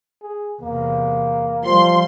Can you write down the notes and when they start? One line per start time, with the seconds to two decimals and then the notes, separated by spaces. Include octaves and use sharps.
0.22 G#4
0.62 E2 C3 A#3
1.65 F3 G3 C6